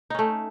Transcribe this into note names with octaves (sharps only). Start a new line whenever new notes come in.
A3 C#4 D#4